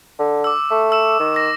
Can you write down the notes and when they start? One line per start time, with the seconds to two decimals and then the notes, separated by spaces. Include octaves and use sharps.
0.19 D3
0.44 D6 E6
0.71 A3
0.92 E6 E7
1.20 D#3
1.35 D6 A#6